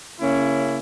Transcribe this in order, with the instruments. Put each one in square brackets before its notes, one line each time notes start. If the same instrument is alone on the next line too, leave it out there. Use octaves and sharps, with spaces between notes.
[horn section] C#3 A#3 C#4 E4